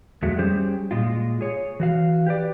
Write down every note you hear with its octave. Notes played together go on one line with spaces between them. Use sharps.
F2 F#3 G#3 A3
G3 C#4 G4 G#4 C5
A#2 G#3 F4
G#4 C#5
E3 F#4 F5
G4 B4 D5